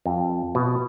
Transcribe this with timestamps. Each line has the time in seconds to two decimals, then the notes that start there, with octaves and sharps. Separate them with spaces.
0.06 F2
0.55 B2